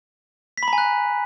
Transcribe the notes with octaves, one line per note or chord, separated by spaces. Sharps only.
B6
B5
A#5
G#5
F#6